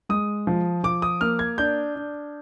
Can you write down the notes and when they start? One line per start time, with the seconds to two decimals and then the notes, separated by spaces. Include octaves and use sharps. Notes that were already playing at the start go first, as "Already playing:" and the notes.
0.09 G#3 D#6
0.47 F3
0.84 F3 D6
1.02 D#6
1.21 A#3 F6
1.39 G#6
1.58 D4 G6
1.95 D4